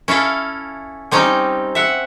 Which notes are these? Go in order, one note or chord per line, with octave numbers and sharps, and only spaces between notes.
C#4 E4 A4 F5
G3 C4 C#4 D#4
E5 F#5